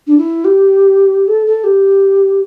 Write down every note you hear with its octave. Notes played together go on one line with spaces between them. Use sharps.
D4
E4
G4
A4
A4
G4